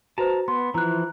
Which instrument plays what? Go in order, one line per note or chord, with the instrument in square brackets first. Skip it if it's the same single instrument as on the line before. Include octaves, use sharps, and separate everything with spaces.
[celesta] F#4 B4 C5 [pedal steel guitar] A5 A#5
[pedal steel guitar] B3 [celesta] C6
[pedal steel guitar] E3 F3 E4 [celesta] A#5 F#6